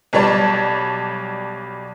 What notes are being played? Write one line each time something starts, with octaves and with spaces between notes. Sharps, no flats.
B1 G3 C#5 D5 A5 E7